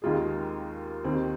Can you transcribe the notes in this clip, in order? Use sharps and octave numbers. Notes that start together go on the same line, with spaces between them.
D#2 D#3 G#3 F4 G#4
D#2 D#3 C4